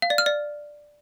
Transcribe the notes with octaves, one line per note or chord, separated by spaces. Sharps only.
F5
D5
F6
D5